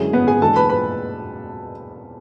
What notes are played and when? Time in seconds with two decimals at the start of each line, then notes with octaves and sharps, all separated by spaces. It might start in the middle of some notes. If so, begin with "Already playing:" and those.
Already playing: F#2 D3 G#3 C#4 E4 G#4
0.13 B3 B4
0.27 G#4 G#5
0.41 E2 B2 G#3 D4 A4 A5
0.56 B4 B5
0.69 B4 B5